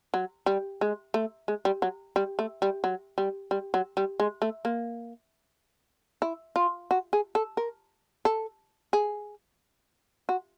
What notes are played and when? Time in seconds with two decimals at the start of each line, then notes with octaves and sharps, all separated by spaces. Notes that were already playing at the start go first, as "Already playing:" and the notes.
0.14 F#3
0.46 G3
0.81 G#3
1.14 A3
1.48 G#3
1.65 G3
1.82 F#3
2.16 G3
2.39 A3
2.62 G3
2.84 F#3
3.18 G3
3.51 G3
3.74 F#3
3.97 G3
4.20 G#3
4.42 A3
4.65 A#3
6.22 E4
6.56 F4
6.91 F#4
7.13 G#4
7.35 A4
7.57 A#4
8.25 A4
8.93 G#4
10.29 F#4